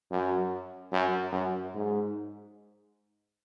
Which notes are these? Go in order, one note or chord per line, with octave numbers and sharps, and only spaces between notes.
F#2
F#2
F#2
G#2